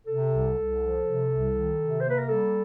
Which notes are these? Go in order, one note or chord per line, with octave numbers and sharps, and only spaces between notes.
C3 A4
C2
C2
F3
C3
C2
D#3
C3
A#3 C5
B4
A#4
G3 A4